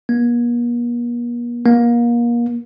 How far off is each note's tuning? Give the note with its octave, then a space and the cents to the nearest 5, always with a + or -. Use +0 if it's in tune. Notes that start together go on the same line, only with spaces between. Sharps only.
A#3 +45
A#3 +30